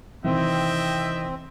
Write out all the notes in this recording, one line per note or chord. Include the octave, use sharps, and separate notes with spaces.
C3 D#3 E3 C4 D#5 E5 G5